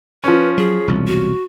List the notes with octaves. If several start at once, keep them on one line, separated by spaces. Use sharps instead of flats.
F3 C#4 B4
F#3 G#4
E1 C2
F#4